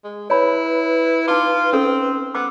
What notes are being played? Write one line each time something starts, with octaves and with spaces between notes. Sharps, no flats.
G#3
E4 B4 C#5 B5
D#4 F4 D6
C4 C#4 A4
B3 D6 E6